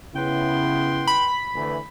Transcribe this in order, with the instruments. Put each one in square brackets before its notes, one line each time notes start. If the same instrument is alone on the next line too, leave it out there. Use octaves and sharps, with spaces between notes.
[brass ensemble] C#3 B3 E4 [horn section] B4 G5 C6
[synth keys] B5
[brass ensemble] D2 E3